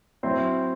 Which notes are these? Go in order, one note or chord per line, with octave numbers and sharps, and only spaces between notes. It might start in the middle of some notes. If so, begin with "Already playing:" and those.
F#3 C4 E4 C5